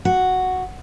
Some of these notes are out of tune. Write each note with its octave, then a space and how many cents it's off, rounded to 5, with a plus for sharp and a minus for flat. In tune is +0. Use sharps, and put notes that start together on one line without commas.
F#4 +0 F#5 +0